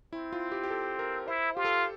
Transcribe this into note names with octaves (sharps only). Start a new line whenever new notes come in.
C4 E4
F4
G4
G4
A4
A#4
E4 C5
F4 G4
A4